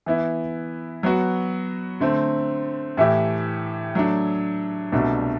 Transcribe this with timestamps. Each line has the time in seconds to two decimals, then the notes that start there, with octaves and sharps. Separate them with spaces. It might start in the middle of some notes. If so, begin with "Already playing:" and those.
0.06 E3 B3 E4
1.03 F#3 B3 F#4
2.00 D3 A3 C4
2.97 A2 E3 A3 E4 G4
3.95 F#3 A3 D4
4.92 C2 B2 A3 D4 F#4